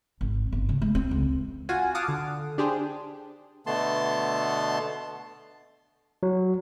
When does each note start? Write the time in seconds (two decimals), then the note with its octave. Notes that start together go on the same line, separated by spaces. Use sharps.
0.21 G#1
0.52 G1
0.69 C#3
0.82 G#3
0.95 C4
1.11 C#2
1.69 F4 F#4 G#5
1.95 F5 F#5 A5 D6 D#6
2.08 D3
2.58 D4 G4 G#4 C5
3.66 B2 D3 A3 B3 A5 C6
6.23 F#3